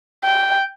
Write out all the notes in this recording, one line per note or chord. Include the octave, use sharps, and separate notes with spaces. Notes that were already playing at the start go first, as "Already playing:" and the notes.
G5